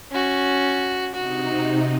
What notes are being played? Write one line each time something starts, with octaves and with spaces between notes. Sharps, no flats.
C#4 F#4
C3 D#4 F#4